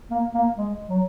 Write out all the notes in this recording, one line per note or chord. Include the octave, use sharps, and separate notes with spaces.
A#3
A#3
G#3
F#3